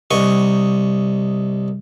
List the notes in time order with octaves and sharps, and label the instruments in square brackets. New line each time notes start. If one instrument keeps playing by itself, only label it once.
[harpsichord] C2 D#5 C#6